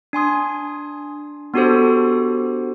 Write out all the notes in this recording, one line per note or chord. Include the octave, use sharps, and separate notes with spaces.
D4 G#5 C6 D#6
B3 D4 F#4 G4 A4 C5